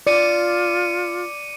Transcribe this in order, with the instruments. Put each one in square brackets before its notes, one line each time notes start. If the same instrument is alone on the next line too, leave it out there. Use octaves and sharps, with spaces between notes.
[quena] F4 [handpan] D5 [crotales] D6 C#7 D#7